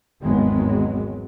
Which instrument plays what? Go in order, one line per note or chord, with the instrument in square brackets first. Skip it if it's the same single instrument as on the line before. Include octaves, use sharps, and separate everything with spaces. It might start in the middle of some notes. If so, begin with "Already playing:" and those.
[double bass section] G#1 E2 D#3 F#3 G#3 B3